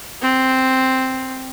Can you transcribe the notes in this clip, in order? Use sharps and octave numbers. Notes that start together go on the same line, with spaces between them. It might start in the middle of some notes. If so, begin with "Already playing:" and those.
C4